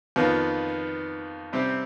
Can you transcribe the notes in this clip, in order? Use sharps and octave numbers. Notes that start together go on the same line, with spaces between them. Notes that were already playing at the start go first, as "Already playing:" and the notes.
F2 D#3 B3 F4
C3 G3 C4 G4